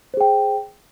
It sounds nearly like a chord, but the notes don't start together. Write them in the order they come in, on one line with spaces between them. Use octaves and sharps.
C5 G#4 G5